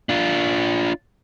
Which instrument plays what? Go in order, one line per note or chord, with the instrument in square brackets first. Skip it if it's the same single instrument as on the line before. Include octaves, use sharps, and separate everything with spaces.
[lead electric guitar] D4 F4